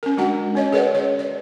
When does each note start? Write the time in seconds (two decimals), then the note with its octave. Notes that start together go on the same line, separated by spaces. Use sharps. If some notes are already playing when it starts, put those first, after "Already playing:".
0.03 C#4 A#4
0.17 G#3 D4 F#4 A#4 F#5
0.55 C#4 C#5 D#5
0.72 G#4 A#4 B4 C#5 D5 F#5
0.95 C#5
1.19 D5